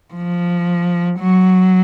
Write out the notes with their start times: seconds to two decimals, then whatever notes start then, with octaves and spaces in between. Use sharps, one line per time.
0.14 F3
1.20 F#3